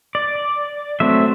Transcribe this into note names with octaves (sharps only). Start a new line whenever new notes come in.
D5
F#3 A3 C4 E5